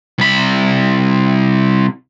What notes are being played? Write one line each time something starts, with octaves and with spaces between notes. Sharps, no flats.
C2 B5